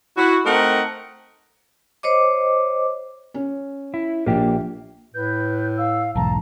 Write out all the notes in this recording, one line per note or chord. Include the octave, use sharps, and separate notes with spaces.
E4 F#4
A3 C4 D#4 A#4 F#5
C5 C#5 D#5 D6
C#4
E4
A#1 A#3 D4 G4
A2 B4 G6
F5 E6
B1 E2 G#2 A5 A#5